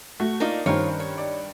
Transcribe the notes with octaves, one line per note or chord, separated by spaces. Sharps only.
A3 F#4
A#3 D4 D#4 F4
G2 D#3 C#4 F4 A#4 C5 C#5
C#5
D5